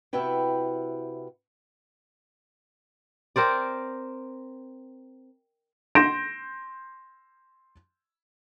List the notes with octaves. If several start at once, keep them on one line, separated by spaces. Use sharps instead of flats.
C3 E4 F#4 B4 G5
C4 A#4 C5 D5
C6 G6 A#6 D7 E7